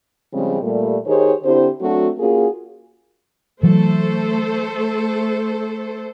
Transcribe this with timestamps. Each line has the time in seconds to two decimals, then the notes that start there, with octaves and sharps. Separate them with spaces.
0.33 C#3 F3 G3 G#3 C4
0.62 A#2 G3 A3
1.06 D#3 D#4 G4 G#4 C5 C#5
1.44 D3 C4 E4 G4 C5
1.81 F#3 A3 C4 D4 F#4
2.19 A#3 C#4 F4 F#4 G#4
3.63 E3 F#3 A3 A4 C5